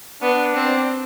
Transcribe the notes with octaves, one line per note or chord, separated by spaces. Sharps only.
B3 D4
C4